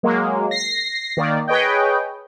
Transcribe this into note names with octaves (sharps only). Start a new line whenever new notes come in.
F#3 G#3 A#3
A#6 C7
D#3 A#3 D5
G#4 B4 C#5 D#5 G5